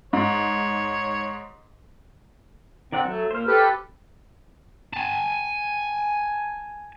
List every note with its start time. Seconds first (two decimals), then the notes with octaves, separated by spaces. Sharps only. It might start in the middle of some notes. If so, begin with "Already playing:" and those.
0.13 G#2 C#5
2.92 D#3 C4 D5 F#5
3.05 F#3 A3 A4
3.31 A#2 C5 F6
3.47 G4 A4 B4
4.93 G#5 A5